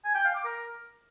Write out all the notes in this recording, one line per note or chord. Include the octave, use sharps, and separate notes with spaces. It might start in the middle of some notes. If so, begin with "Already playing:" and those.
G#5
G5
F5
D6
A#4